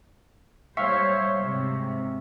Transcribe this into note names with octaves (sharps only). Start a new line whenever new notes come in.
G3 C5 C#5 E5 F5 C#6 B6 C#7
G#2 C3